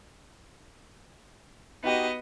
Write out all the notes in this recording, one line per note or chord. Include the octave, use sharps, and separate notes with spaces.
B3 D#4 F#4 G4 D#5